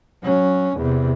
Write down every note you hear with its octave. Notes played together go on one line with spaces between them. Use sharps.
F#3 C#4
E2 C3